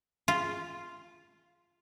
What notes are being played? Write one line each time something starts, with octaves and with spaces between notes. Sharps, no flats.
F4